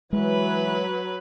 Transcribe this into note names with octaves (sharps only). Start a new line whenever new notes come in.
E3 F#3 G#3 B4